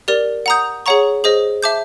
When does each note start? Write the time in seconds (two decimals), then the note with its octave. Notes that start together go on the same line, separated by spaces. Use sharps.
0.08 G4 A#4 D5
0.46 F#5 A#5 D#6 G6
0.86 G#4 C#5 F#5 A#5 C#6
1.24 G#4 C5 D#5
1.63 E5 A5 D6 G6